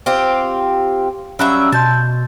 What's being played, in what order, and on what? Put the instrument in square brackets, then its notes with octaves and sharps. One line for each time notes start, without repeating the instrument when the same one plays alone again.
[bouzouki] C4 F4 G4
[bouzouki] F#3 G3 E5 [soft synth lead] C#4 [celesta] F5 B5 F#6
[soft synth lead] B2 [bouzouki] A5 [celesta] C6 G6 A6